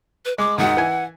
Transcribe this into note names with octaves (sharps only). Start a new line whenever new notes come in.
B4
G#3 D6
D#2 G#2 F#4 F#5
E3 G#5